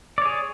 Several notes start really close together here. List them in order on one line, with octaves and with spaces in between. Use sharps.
D5 C#5 G#4